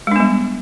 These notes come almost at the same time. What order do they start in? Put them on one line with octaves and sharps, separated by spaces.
G#3 D4 B3 G3